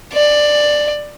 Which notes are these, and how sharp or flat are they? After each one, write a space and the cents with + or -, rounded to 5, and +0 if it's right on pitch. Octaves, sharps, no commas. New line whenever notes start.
D5 +10